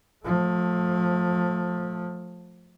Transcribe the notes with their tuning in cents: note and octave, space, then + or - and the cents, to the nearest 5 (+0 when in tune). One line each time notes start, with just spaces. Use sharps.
F3 +25 A3 +0